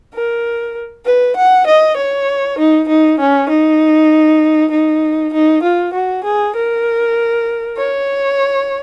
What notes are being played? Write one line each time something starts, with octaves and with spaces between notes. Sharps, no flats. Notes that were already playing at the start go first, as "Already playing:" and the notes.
A#4
B4
F#5
D#5
C#5
D#4
D#4
C#4
D#4
D#4
D#4
F4
F#4
G#4
A#4
C#5